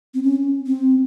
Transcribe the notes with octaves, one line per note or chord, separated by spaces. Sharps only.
C4
C#4
C4